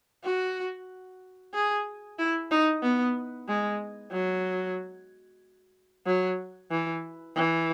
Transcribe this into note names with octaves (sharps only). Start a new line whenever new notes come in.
F#4
G#4
E4
D#4
B3
G#3
F#3
F#3
E3
E3